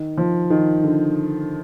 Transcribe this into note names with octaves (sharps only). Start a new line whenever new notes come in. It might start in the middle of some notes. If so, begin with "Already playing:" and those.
Already playing: D#3
F3
D#3
D3